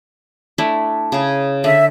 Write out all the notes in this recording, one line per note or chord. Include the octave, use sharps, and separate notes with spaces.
A3 D4 E4
C#3 G#4
D3 E5